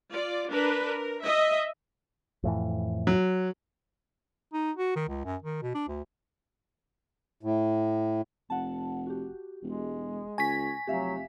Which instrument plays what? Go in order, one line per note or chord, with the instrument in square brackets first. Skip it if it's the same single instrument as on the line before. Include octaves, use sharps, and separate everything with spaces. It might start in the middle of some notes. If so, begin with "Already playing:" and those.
[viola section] F4 D5
D4 A#4 B4
A#4
D#5 E5
[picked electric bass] F2 A2 E3
[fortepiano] F#3
[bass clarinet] D#4
F#4
D#3
C#2
F#2
D#3
B2
D4
D2
[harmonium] A2
[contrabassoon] F1 [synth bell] F#5 A5
[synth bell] F#4 G4
[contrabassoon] E1 [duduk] G#3
[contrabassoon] C#2 [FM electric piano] G#5 B6 [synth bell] C#6 A#6
[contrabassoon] F1 [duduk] F#3 [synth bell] G4 E5 F5